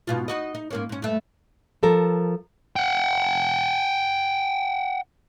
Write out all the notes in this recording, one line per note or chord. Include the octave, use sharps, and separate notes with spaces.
G#2 B2 F4
D#4 F#4 D#5
D#4
G#2 A#3 C#4
G#2 C#4
G2 A3
F3 A4 A#4
F#5 G5